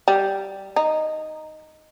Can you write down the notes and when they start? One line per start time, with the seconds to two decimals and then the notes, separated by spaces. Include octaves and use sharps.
0.08 G3
0.76 D#4